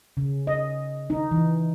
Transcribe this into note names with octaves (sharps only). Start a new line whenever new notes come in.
C#3
D#5
D#4
E3